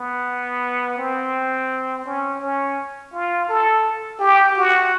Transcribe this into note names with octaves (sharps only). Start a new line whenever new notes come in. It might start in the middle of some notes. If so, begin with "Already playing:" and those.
Already playing: B3
C4
C#4
C#4
F4
A4
G4
F#4